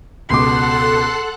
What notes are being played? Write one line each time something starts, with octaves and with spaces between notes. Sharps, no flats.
C#2 B2 A4 F#5 C6 D6 F#6